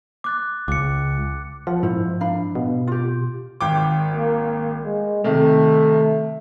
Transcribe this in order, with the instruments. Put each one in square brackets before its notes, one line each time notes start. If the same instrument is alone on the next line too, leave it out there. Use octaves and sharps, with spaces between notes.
[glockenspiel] D6 F#6 A6
[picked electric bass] C#2 [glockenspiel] D6 C#7
[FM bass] F3 [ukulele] F#5
[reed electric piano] G#2 [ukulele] E4 C5
[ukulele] D4 F5 B5
[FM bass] B2
[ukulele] F4 G4
[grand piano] G#1 G5 D6
[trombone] A#3
G#3
[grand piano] C3 D#3 [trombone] A3